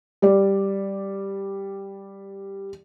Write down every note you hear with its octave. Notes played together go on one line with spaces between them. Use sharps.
G3 D5